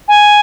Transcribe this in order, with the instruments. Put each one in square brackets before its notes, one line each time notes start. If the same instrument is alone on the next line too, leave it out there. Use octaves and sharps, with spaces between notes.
[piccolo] G#5